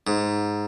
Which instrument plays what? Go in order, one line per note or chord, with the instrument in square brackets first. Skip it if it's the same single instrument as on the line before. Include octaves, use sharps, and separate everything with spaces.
[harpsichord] G#2